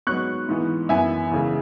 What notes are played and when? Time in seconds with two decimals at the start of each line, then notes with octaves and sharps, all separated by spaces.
0.07 G#2 F#3 B3 C#6 F#6
0.49 G#2 E3 B3
0.89 F#2 E3 B3 E5 G#5
1.31 E2 C#3 G#3